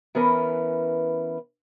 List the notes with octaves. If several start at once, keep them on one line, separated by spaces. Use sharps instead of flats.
E3 B3 C#4 A#4 B4